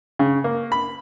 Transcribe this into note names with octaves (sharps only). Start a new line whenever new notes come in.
C#3
A#3
B5